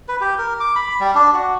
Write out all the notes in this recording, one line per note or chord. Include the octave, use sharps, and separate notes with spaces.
B4
G4
A#4
D6
B5
G3
D4
F#4